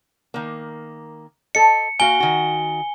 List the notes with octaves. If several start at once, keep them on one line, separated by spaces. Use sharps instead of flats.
D#3 A#3
A4 D#5 C#7
A#3 F#4 F5 G#5 G7
D#3 F#4